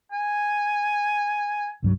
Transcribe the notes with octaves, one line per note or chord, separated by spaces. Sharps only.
G#5
C2 G2 F#3